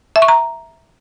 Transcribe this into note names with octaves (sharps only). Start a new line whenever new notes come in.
E5
C#6
A#5